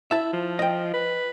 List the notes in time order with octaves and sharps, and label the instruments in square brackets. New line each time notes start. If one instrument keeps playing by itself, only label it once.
[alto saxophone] E4 [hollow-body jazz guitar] E5 A5
[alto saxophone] F3
[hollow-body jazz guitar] D#5 G5
[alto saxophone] B4